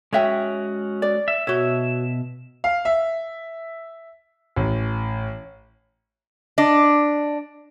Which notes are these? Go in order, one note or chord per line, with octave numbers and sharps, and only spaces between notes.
G#3 C#4 F#4 C#5 E5 G5
D5
E5
B2 F#4 C#5 E5
F5
E5
A1
D4 D#5